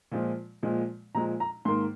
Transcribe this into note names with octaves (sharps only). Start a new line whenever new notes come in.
A#2 F3 G#3
A#2 F3 G#3
A#2 F3 G#3 A#5
A#5
G#2 D#3 A#3 C6